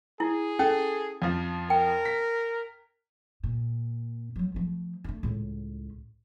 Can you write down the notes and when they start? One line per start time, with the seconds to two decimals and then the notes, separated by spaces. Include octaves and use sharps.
0.20 E4 G#4
0.59 C#4 A4
1.22 F2 F3
1.70 A#4 G5
2.05 B6
3.43 A#2
4.36 F3 F#3
4.54 F3 A3
5.04 A3 D4
5.23 C#2 A2